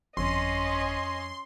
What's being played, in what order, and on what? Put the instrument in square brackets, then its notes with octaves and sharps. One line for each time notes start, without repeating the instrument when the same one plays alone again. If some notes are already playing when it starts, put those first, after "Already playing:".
[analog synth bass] G1 [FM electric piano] F2 [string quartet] C#4 D#5 [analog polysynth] C6